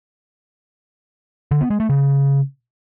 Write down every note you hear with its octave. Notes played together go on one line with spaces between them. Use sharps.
D3
B3
G#3
A3
C#3